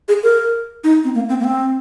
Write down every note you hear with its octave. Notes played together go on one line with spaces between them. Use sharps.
G#4
A#4
D#4
C4
A#3
C4
A#3
C4